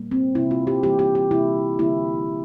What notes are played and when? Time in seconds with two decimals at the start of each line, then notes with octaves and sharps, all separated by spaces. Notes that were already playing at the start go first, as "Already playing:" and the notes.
Already playing: A#2 G3 A#3
0.11 C4
0.35 C3 G3 A#3 E4
0.51 F4
0.67 G4
0.83 E3 G3 A#3 G4
0.99 G4
1.15 G4
1.31 C3 G3 A#3 E4
1.79 D3 G3 A#3 E4